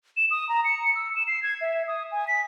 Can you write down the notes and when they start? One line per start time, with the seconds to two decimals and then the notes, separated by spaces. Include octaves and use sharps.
0.17 E7
0.31 D#6
0.49 A#5
0.65 C#7
0.95 E6
1.16 E7
1.28 C7
1.43 G#6
1.61 E5
1.88 D#6
2.12 G#5
2.28 B6